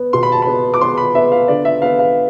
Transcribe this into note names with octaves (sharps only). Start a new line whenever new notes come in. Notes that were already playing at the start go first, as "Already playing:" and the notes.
Already playing: B3
B2 C6
B5
A5
B3 B5
D6
B3 C6
B5
B3 E5
F5
D3 D5
E5
B3 F5
F5